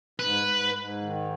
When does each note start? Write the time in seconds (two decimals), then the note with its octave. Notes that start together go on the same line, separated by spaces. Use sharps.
0.19 G#2 B4
0.48 G#2
0.75 G#2
1.02 D#3